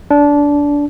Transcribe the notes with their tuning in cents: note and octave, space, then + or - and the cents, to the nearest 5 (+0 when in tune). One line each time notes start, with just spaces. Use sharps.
D4 -20